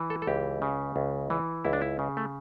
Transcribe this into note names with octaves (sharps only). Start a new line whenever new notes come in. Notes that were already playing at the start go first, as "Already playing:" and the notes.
Already playing: E3
A4
A4
C#2 G4
C#3
C#2
E3
C#2 E4
D4
E4
C#3
A3